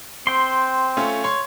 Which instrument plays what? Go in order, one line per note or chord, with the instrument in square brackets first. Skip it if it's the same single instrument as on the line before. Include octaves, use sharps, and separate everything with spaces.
[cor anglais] C4 [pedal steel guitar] G5 C6
[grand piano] A3 C#4 F4
C#5 C6